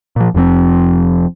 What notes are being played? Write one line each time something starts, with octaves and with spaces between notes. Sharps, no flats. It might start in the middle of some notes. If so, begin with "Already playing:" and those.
A#2 F3
F1 F2 F3 C4